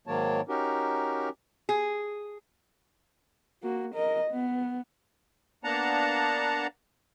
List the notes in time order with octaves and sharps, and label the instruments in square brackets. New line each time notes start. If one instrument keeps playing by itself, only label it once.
[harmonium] G#2 D#3 F#3 A#3 C#5 A5
C#4 D#4 F#4 G4 A#4
[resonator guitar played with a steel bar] G#4
[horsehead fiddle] A#3 F#4
A#4 D#5
B3
[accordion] A#3 B3 D4 F#5 A5 A#5